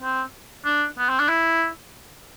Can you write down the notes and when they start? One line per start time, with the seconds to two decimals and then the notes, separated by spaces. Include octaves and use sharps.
0.03 C4
0.66 D4
0.99 B3
1.09 C4
1.19 D4
1.29 E4